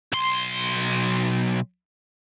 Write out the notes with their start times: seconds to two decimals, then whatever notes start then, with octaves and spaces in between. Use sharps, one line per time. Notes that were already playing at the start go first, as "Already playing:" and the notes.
0.12 B1 C6